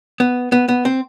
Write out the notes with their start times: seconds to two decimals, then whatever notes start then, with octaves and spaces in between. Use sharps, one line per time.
0.20 B3
0.52 B3
0.68 B3
0.85 C4